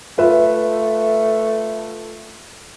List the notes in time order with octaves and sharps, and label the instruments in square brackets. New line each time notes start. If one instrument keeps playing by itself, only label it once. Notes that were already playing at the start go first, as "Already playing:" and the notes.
[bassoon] A3 [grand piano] F4 B4 E5